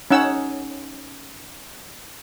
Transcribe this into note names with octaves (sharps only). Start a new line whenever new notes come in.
C#4 D#4 F#5 E6